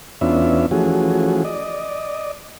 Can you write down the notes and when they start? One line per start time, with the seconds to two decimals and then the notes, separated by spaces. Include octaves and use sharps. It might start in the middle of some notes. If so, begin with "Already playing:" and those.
0.21 E2 B3 C#4 D4 F4 E5
0.71 E3 F3 A3 C#4 F#4 G#4
1.45 D5 D#5